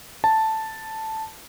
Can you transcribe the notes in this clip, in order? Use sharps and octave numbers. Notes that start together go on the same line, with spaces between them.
A5